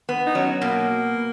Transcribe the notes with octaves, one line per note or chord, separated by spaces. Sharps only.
B3
D#4
F#3 C#4
B2 A#3